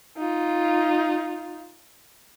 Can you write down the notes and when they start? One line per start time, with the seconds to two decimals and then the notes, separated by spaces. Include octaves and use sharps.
0.17 D#4 F4